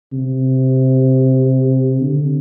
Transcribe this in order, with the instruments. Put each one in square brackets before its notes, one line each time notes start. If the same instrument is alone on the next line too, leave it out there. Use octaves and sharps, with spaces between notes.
[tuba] C3
D3